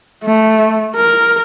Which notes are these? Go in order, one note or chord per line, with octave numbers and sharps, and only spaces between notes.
A3
A#4